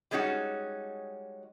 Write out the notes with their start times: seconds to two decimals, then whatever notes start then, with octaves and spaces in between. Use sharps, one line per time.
0.11 G3 G#3 C#4 D#4 F#4